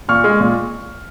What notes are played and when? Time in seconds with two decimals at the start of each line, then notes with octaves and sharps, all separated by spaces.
0.09 A#2 C#6 F6
0.24 G#3
0.40 A#2